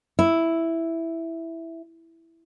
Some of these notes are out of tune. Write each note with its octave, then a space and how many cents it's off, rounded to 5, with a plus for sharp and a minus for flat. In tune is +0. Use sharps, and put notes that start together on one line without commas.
E4 +0